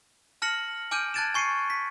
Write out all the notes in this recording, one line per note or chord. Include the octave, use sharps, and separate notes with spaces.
A5 F6 A#6 C#7 F#7
G#5 D6 F6 G6 D7 D#7
A5 F#6 G#6 A6 D7 E7
G#5 C#6 C7 C#7 D#7
B6